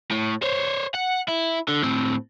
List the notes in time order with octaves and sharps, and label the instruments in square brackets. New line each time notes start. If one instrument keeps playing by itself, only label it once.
[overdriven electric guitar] A2
C5 C#5
F#5
E4
D3
A2 C4